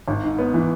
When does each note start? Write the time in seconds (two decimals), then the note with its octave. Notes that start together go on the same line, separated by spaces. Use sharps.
0.08 G#1
0.23 G#2
0.38 B3
0.54 E3